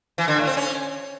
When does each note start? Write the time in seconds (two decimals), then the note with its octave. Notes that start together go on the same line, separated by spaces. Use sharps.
0.18 E3
0.28 D3
0.38 A2
0.47 C4
0.57 C#4